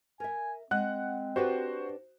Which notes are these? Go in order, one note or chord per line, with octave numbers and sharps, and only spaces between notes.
A#4 E5 G#5
G#3 C4 F#5 F#6
D4 F#4 G4 B4 C5